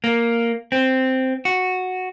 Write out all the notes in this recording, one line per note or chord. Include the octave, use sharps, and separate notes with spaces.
A#3
C4
F#4